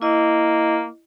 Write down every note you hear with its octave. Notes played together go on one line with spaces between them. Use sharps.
A#3 E4 D#5